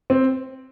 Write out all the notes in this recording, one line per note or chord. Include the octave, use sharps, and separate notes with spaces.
C4